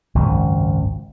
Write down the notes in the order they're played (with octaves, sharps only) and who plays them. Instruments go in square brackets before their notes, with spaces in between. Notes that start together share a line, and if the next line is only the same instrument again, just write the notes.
[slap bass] G#1 C#2 F#2